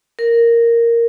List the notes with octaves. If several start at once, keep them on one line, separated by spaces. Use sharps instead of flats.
A#4